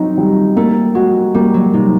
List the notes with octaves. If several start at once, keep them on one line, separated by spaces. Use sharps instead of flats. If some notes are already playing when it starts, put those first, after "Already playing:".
Already playing: F#3 C4 D#4
G3
A3 A#3
G#3 F#4
G3 A#3
F#3
C3 D#4